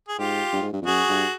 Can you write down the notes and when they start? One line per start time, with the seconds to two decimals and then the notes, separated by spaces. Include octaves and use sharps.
0.08 G#4
0.19 G#2 F4 G4
0.53 G2
0.62 G#2
0.72 G2
0.82 F2
0.86 F#2 F#4 G#4
1.09 G2